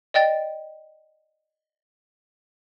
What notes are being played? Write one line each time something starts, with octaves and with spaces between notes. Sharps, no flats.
D5 D#5 G5 A6